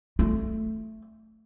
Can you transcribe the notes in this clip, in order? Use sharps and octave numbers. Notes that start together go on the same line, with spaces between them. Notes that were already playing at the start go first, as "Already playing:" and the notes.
A3